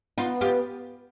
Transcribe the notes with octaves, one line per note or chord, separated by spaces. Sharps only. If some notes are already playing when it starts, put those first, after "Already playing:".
B3 D#4 F4
F4 G4